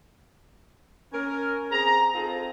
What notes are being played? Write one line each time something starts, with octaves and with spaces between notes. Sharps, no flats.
C#4 A#4
C4 G#4 A#5
C4 D#4 F4 G#4 A4